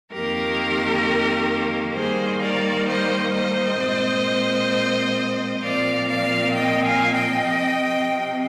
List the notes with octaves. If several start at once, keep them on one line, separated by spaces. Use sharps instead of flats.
F2 D#3 A#3 G4 A#4
G2 D#3 G3 A#3 G#4 C5
A#4 D5
C5 D#5
C5 D#5
A#2 G#3 C4
A#2 F3 C4 D5 F5
D5 F5
D#5 G5
F5 G#5
D#5 G5
C3 F3 C4